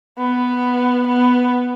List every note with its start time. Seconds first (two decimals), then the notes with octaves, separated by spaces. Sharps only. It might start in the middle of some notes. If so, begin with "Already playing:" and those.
0.18 B3
1.08 B3